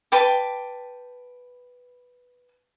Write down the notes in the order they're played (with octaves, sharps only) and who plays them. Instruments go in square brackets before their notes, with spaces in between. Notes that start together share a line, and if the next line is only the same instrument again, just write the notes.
[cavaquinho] B4 G5 A5 D6